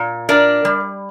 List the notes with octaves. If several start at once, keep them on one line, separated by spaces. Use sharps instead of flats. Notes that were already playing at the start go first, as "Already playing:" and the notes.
Already playing: A#2
D4 A#4 D5
G3